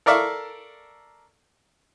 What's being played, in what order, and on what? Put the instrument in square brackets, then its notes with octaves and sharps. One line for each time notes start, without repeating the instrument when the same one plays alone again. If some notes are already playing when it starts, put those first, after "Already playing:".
[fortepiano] A4 A#4 D5 E5 F5 C#6